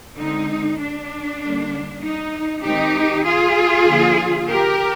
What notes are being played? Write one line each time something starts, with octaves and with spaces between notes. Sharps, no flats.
D3 G#3 C4 D#4
D4
D3 G3 A#3
D#4
D#3 G#3 C4 D#4 G4
F4 G#4
D3 F3 A#3
G4 A#4